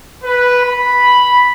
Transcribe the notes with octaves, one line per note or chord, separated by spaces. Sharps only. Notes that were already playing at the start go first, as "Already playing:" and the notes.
B4
B5